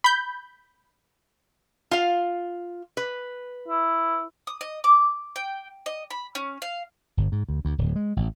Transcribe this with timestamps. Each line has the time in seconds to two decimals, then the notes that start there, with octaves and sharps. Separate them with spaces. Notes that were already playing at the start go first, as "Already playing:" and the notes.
0.04 B5 G6
1.91 F4 F5
2.97 B4
3.68 E4
4.47 D#6
4.61 D#5
4.84 D6
5.36 G5
5.86 D#5
6.11 B5
6.35 C#4
6.62 F5
7.17 G1
7.32 G#2
7.49 D2
7.65 D2
7.78 D1
7.96 G#3
8.17 A1